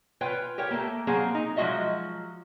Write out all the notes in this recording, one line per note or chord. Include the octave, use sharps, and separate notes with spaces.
F4 B4 C#5 G5
G4 A#4 C#5 G5
A3 A#3
F#3 A#3 C4 G#4 C5
D#4
F3 F#3 G#3 F#4 D#5 E5